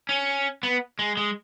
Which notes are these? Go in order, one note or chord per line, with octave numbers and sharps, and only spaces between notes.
C#4
B3
G#3
G#3